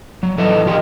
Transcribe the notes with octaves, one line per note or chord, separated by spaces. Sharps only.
F#3
E3 A4 B4 D#5
D#3 F4 G4 G#4 A#4 D#5